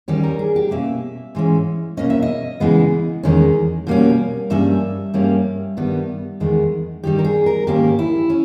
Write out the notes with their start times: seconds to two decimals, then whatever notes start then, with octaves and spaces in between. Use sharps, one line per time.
0.08 D#2 D#3 G3 C#4 G4
0.23 A#4
0.39 G#4
0.56 G4
0.71 B2 A#3 C#4 E5
1.35 G#2 E3 G#3 C#4
1.97 B2 A#3 C#4 D#5
2.10 E5
2.22 D#5
2.60 C#3 E3 G#3 B3
3.23 E2 D#3 G#3 C#4
3.87 B2 G3 A#3 C#4
4.50 G2 G3 A#3 C#4 E5
5.14 G2 G3 A#3 C#4
5.77 G2 D#3 G3 B3
6.40 E2 D#3 G#3 B3
7.03 G2 D#3 G3 G4
7.18 A#4
7.24 G#4
7.46 A#4
7.67 G#2 D#3 A#3 C#4 G4
7.99 E4
8.30 C#4